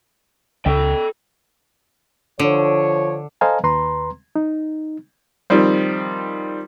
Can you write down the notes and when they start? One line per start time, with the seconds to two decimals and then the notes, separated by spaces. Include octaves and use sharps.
0.66 C#2 A4 G5
2.39 D3 F3 C#5
3.41 A4 C5 D#5 F5 G#5 A#5
3.63 D#2 B4 A#5 C6
4.36 D#4
5.50 D#3 F3 G3 C4